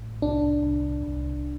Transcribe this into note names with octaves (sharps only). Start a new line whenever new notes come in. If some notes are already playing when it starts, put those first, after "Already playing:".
Already playing: A1 A2
C2 D4
C2
C2